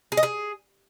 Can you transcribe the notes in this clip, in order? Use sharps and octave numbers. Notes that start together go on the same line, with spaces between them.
G#4
D#5
G#4